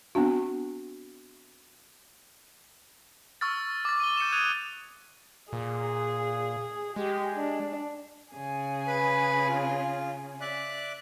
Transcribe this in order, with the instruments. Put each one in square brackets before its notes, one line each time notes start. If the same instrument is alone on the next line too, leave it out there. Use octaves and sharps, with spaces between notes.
[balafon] B3 C4 D4 F#4
[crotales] C#6 E6 F6 A6
D6 A6
D#7 G7
G6 C#7 D#7 E7
D#6 F#6 G#6 D#7 F7
[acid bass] A#2 [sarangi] G#4
[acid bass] G#3 [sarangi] G4
[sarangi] D4
[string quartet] C#3 G#4
[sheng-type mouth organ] B4 B5
F4
D5 E5 F#6